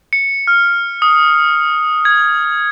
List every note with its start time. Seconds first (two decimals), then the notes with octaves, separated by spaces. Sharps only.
0.13 C#7
0.47 F6
1.02 D#6
2.05 G#6